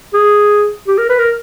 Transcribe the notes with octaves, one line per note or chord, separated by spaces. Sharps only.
G#4
G4
A#4
B4
A#4